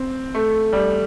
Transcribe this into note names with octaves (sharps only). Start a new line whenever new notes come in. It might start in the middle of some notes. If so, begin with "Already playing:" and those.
Already playing: C4
A3
G3